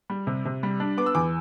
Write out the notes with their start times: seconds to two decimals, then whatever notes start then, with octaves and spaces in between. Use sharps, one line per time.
0.10 G3
0.27 C3
0.45 C3
0.63 G3
0.80 D4
0.97 B3 D6
1.06 E6
1.15 E2 D6